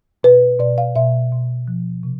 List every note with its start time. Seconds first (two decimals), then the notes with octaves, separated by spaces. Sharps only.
0.23 B2 B4
0.59 B2 D5
0.78 F5
0.96 B2 E5
1.32 B2
1.68 F3
2.03 C3